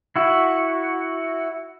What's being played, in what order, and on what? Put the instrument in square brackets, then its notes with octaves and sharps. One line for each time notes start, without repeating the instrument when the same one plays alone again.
[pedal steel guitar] E4 F#4